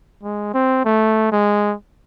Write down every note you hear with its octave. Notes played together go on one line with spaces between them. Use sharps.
G#3
C4
A3
G#3